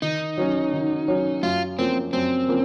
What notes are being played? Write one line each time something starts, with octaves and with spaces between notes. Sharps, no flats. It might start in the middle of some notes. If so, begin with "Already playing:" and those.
D#3 D#4
F#3 C#4
D#3
F#3 C#4
F#2 F4
F3 A#3 C4 C#4
F#2 C4
F3 A#3 C#4